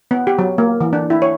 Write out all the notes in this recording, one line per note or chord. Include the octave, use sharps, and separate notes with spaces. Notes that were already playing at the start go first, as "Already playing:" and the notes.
B3
G4
F#3
A#3
E3
D4
E4
C#5